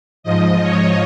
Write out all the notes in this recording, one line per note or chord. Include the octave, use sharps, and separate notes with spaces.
G#2 F3 D#5
C#5